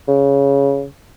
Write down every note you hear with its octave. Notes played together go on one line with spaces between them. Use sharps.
C#3